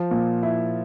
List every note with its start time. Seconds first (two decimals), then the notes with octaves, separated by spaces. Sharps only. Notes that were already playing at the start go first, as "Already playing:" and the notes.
Already playing: F3
0.11 A#2
0.43 E4